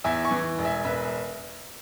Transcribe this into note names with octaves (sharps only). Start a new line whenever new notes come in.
E2 E5 G#5
G#5 C#6
E3
E1
E5 G#5
E1 B4 E5